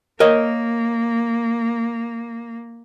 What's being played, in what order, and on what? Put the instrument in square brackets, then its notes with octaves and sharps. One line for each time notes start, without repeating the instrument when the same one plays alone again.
[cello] A#3 [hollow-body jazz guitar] A#4 C#5 D#5